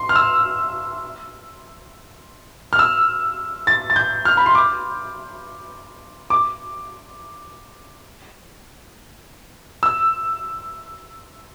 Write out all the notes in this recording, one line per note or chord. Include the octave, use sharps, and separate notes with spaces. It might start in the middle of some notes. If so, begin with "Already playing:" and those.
Already playing: C6
F6
E6
F6
E6
A6
A6
G6
F6
B5
C6
D6
D6
E6